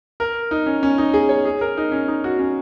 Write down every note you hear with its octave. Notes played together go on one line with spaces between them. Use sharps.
A#4
D#4
C#4
C#4
D#4
G#4
C#5
G#4
A#4
D#4
C#4
D#4
F#4
C#4